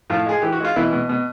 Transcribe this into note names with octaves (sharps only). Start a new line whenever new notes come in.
A2 F3 F4
G#3 G#4
E3 G4
F#4
G#3 F4
B2 E3 E4
B2
B2